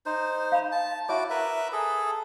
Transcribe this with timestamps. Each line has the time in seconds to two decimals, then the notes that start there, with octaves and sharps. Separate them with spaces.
0.06 D#4 C5
0.52 F5 A#5 B5
0.72 A5
1.09 E4 F#4 C#5 D6
1.30 A#4 B4 E5
1.73 G#4 A4